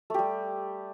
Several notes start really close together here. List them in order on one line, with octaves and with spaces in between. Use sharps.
A3 G4 G3